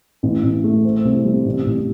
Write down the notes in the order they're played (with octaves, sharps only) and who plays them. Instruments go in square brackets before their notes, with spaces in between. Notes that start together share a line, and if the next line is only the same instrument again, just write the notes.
[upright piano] A1
A1
A3
C4
C2
G3
A1
A1